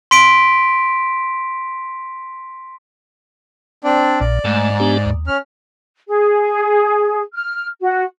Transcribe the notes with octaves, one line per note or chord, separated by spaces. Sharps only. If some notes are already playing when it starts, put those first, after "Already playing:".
C6 B6 D7
C4 D4 D5
A#1 A#2 D5
G#2 A3
B3 D4 G4
D#2
C#4 F6
G#4
F6
F#4